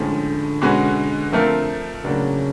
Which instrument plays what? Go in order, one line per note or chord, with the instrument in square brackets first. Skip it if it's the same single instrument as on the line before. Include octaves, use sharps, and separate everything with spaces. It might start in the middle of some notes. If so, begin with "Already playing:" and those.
Already playing: [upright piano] A2 F3 G#3 C#4 [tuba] D3
[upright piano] B2 G#3 C#4 F#4 B4
F3 A3 C4 F4 A#4
[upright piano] A2 F#3 A#3 D4 F#4 [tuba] C#3